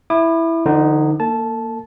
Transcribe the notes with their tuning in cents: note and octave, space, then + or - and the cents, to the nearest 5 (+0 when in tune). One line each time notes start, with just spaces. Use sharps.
E4 +0 D6 +45
D3 +30 F3 -20 D#4 +0
A#3 +0 A4 +40 A5 -10